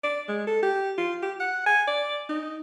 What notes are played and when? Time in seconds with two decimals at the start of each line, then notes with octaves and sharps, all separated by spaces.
0.04 D5
0.28 G#3
0.47 A4
0.63 G4
0.98 F4
1.22 G4
1.40 F#5
1.66 G#5
1.88 D5
2.29 D#4